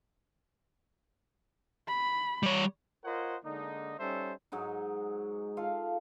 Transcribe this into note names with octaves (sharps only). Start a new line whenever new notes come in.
B5
G3 C#5
F4 A#4 C5 C#5 D#5 F#5
D3 G#3 A#3 D4 D#4
G3 C#4 D#4 A4 C5 E5
G#2 F#3 G#3 D#4
F4 A4 F5